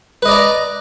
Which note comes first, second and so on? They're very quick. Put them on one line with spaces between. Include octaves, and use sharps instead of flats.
B4 D#5 D5 A#5